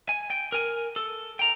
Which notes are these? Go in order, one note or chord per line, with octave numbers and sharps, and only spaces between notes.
G#5
G5
A#4 G#5
A4
G5 A#5